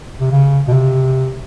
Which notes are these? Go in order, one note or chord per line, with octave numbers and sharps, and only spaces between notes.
C3
C#3
B2
C3